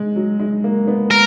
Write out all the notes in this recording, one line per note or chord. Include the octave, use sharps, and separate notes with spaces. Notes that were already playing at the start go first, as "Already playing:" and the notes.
Already playing: G#3
F#3
G#3
A#3
B3
A#4